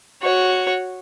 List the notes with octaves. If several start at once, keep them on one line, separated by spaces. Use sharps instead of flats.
F#4 C#5